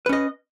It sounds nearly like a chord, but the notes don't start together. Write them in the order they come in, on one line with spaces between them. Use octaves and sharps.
B4 C#4 D#5